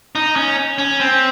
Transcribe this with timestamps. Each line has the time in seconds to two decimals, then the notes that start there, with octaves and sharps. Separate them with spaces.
0.15 D#4
0.36 C#4
0.78 C#4
1.00 C4